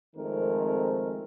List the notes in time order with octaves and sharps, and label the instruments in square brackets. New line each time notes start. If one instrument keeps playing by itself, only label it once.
[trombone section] F2 D#3 G#3 A3 C4 A#4